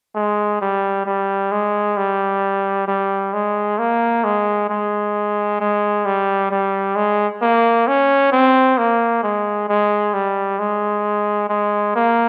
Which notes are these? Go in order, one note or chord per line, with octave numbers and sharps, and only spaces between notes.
G#3
G3
G3
G#3
G3
G3
G#3
A#3
G#3
G#3
G#3
G3
G3
G#3
A#3
C#4
C4
A#3
G#3
G#3
G3
G#3
G#3
A#3